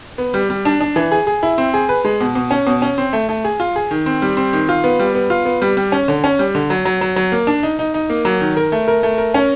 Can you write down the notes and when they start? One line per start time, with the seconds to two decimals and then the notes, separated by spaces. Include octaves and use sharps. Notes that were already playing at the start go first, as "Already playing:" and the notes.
0.18 B3
0.34 G3
0.50 G3
0.65 D4
0.81 D4
0.96 E3
1.12 G#4
1.27 G#4
1.43 E4
1.58 C4
1.74 G#4
1.89 B4
2.05 G#3
2.21 B2
2.35 B2
2.51 C#4
2.67 B2
2.82 C#4
2.98 C4
3.13 A3
3.29 A3
3.44 G#4
3.60 F4
3.76 G#4
3.91 D#3
4.06 C4
4.22 G3
4.37 C4
4.53 D#3
4.69 F4
4.84 B3
4.99 G3
5.15 B3
5.30 F4
5.45 B3
5.62 G3
5.77 G3
5.92 C#4
6.08 D3
6.24 C#4
6.39 G3
6.55 D3
6.70 F#3
6.85 F#3
7.01 F#3
7.16 F#3
7.32 A#3
7.47 D4
7.63 D#4
7.79 D#4
7.94 D#4
8.10 A#3
8.25 F#3
8.41 D#3
8.57 A#4
8.72 A3
8.88 A#4
9.03 A3
9.18 A#4
9.34 C#4